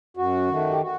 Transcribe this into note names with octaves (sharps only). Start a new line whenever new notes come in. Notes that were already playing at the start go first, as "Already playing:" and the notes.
F#2 F#4
D#3 A3
G4
F#4